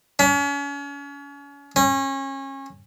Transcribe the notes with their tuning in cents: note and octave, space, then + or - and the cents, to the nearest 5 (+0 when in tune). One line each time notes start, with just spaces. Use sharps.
C#4 +35
C#4 -30